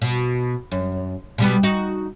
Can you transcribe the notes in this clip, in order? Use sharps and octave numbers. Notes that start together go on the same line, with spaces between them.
B2
F#2
B2 G3 B3
D#4 F#4